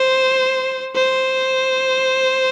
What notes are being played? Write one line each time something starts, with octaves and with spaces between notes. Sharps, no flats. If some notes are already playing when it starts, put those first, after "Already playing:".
Already playing: C5
C5